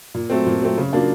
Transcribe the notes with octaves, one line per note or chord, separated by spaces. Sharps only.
A#2
F#3 A3 C4
A#2
F#3 A3 C4
C#3
F#3 A#3 D4 F4